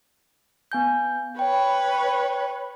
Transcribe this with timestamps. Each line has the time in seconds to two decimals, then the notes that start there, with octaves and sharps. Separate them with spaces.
0.72 B3 G#5 G6
1.39 B4 C#5 G5 B5